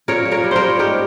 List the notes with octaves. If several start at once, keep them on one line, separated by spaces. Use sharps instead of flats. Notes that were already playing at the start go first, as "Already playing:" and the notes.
A#2 A#4 C#5
A#2
A#4 C#5
G3
A#4 C5 C#5
G3
G#2 G4 A#4